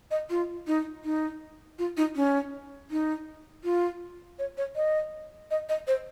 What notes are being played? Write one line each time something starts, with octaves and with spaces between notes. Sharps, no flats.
D#5
F4
D#4
D#4
F4
D#4
C#4
D#4
F4
C#5
C#5
D#5
D#5
D#5
C5